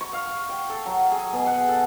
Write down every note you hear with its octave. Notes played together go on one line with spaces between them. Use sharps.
C#6
F5
G5
A4
F#3
G#4
B2
F#5
A4